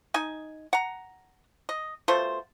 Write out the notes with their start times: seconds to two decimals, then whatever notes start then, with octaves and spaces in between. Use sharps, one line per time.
0.14 D#4 G#5
0.73 F#5 A#5
1.69 D#5
2.08 B2 A3 F4 C5